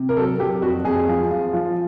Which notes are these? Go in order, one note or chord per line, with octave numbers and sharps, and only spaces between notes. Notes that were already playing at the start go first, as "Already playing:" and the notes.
Already playing: C3
A#4
F#3 A4
F#3 G4
F2 F#4
F2 G#4
F3
F3
F3